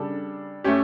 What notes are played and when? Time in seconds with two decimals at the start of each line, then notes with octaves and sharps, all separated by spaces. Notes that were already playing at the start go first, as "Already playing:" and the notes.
Already playing: C#3 G3 D4 A4
0.64 A3 C#4 G4